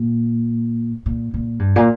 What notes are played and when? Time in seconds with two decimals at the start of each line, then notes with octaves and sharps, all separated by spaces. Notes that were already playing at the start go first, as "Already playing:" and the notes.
Already playing: A#2
1.06 A#2
1.34 A#2
1.59 G2
1.76 A#2